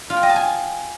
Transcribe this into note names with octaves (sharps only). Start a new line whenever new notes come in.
F4
G5
D#5
A5
G#5